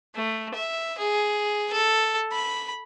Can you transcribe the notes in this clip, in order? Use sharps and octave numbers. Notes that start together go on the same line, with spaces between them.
A3
E5
G#4
A4
B5